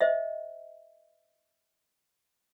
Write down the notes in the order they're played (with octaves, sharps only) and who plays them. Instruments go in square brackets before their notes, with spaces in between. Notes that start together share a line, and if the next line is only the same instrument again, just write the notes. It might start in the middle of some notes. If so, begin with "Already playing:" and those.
[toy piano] C5 D#5 E5